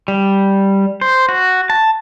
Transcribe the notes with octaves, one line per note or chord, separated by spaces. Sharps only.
G3
C5
F#4
A5